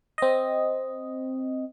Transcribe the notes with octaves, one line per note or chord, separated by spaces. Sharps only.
C4 D#5